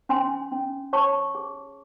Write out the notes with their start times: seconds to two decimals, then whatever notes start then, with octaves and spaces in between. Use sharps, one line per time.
0.09 C#4 G#5 C6
0.52 C#4
0.93 C#5 A5 C#6
1.35 G#4